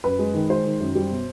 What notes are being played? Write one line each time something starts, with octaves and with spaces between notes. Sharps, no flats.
F#2 B4
G#3
D#3
G#3 C5
D#3
F#2
G3
B2